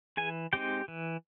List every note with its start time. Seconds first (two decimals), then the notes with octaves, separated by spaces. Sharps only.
0.17 E3 G#4 G#5
0.53 G#3 C4 D#4 G4 G5
0.88 E3